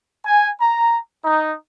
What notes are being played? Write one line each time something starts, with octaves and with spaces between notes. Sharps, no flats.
G#5
A#5
D#4